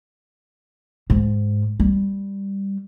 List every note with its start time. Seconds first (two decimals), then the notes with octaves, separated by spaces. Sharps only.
1.10 G#2
1.80 G3